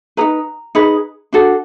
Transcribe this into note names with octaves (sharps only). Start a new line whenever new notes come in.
D#4 G#4 B4 A#5
D#4 G#4 B4
D4 F#4 A4